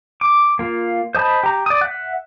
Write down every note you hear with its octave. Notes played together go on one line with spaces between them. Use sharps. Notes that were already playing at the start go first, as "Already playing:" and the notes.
D6
A#3 F4
C5 D#5 A5 B5
G4 A#5
D5 D#6
E5 F#5